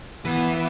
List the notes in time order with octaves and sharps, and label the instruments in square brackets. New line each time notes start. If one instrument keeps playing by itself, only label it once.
[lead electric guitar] E3 [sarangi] B3